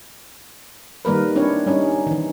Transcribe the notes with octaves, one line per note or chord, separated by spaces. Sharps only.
D#3 G3 A#3 A#4 B4
C4 D4 E4 C#5
G3 C#4 D#4
D#3 E3